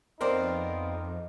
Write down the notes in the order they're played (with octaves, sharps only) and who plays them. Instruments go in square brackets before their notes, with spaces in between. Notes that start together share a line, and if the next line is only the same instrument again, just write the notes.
[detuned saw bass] F2 [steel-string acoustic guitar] B3 C4 F4 [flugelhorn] D#4 [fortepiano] A#4 C5 D5